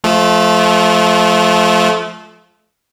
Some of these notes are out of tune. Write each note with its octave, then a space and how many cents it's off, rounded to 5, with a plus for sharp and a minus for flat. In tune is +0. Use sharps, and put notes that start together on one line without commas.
F3 +0 A3 -25